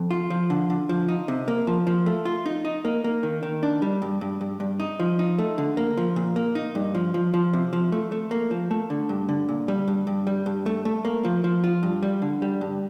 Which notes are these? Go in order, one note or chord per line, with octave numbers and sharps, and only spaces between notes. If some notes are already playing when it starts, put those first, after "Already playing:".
Already playing: F2
F4
F3
D3
D3
F3
D#4
C3
A#3
F3
F3
A3
F4
D#4
D#4
A#3
A#3
D#3
D#3
D4
G3
G2
G2
G2
G2
D#4
F3
D#4
A3
D3
A#3
F3
A#2
A#3
D#4
G2
F3
F3
F3
C3
F3
A3
A3
A#3
F3
A3
D3
G2
D3
A#2
G3
G2
G2
G3
G2
A3
A3
A#3
F3
F3
F4
G2
G3
D3
G3
G2